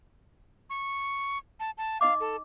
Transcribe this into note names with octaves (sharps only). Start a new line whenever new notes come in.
C#6
A5
A5
D#4 D#5 F5 D6
A4